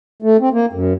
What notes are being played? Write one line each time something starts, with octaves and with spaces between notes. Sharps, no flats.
A3
C4
A#3
F#2